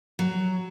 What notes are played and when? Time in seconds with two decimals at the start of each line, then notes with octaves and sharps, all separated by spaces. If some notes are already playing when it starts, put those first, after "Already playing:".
0.19 F#3